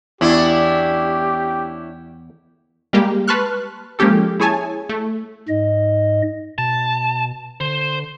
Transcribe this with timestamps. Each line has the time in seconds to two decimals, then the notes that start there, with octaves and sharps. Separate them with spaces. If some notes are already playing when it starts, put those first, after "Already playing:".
0.21 E2 C#4 D4 E4 G4
2.93 G3 G#3 A#3 G4
3.28 B4 A5 C6 C#6 F6 F#6
3.99 F3 G#3 A#3 C#4 G4 A4
4.40 E4 G#4 C#5 G#5 A5
4.89 A3
5.48 G#2 D#5
6.58 B2 A5
7.61 D3 C5